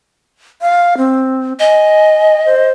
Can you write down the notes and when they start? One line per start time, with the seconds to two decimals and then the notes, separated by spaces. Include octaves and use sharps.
0.62 F5
0.98 C4
1.59 D#5 G#5
2.46 C5